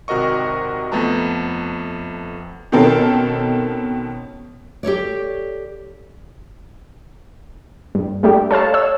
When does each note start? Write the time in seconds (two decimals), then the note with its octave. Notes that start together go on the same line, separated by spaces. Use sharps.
0.08 G#1 C3 F#4 A#4 D#5 C#6
0.92 F2 A3 B3 A5 A#5
2.72 B2 D#3 C4 C#4 A4 A#4
4.83 G4 A4 C#5 D5
7.95 G2
8.23 G3 A3 D4 G4
8.51 A4 C#5 F5 A5
8.74 C#5 E6